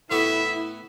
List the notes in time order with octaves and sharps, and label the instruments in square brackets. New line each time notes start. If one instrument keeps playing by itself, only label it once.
[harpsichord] A2 B3 F#4 [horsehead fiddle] E4 [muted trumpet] E5